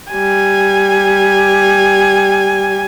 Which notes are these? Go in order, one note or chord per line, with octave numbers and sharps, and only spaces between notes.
G3 G#5